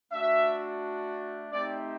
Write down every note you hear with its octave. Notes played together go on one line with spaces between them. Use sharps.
A3 D4 F#4 E5
A3 C4 D#4 G4 D5